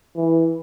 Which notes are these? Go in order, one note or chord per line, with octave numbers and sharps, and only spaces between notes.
E3